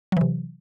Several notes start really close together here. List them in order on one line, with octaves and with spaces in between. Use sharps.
F#3 E3 C3